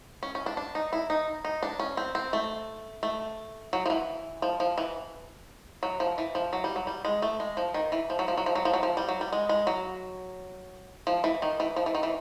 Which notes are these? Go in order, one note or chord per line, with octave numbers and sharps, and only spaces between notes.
C#4
C#4
D4
D4
D#4
E4
D#4
D#4
D4
C#4
C4
C4
A3
A3
F#3
F3
E3
F3
F3
E3
F#3
F3
E3
F3
F#3
G3
F#3
G3
G#3
A3
G#3
F3
D#3
E3
F3
F#3
F3
F#3
F3
F#3
F3
F#3
F3
G3
F#3
G3
G#3
G#3
F#3
F3
E3
D#3
E3
F3
E3
D#3
E3